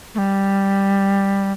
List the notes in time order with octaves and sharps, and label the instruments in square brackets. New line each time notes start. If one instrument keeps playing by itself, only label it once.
[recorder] A3
G3